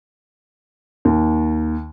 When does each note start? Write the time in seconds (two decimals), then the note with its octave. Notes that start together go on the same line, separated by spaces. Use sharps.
1.05 D#2